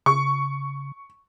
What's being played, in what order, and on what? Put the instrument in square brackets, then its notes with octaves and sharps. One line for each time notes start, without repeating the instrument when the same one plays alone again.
[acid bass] C#3 [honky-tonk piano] C#6